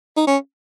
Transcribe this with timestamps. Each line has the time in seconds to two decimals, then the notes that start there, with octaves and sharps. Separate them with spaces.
0.17 D#4
0.27 C#4